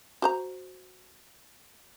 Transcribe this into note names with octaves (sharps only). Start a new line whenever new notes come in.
F#4 C5 A#5